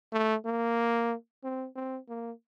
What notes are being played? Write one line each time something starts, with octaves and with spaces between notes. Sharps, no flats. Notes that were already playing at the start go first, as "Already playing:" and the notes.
A3
A#3
C4
C4
A#3